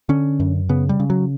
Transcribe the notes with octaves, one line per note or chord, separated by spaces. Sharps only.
D3 C#4
F#2
C#3 B3
G3
C#3
F#3